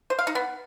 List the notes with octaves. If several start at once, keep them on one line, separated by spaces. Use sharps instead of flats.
C5
F5
D#4
B3